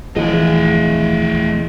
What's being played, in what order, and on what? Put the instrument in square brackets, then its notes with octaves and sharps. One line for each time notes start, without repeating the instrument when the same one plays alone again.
[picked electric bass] D#1 F3 [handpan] E3 E4 G#4 [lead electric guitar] A3 D#5